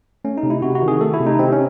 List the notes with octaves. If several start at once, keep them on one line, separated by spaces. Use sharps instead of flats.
A3 C#4
D#4
C3
E4
C3 F#4
F#4
D#3
G#4
A3 A4
E4
C3
D#4
C3 C4
C#4